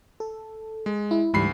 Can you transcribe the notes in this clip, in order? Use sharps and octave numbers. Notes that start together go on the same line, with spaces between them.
A4
G#3
E4
D2 G#2 E3 G3 B5 C7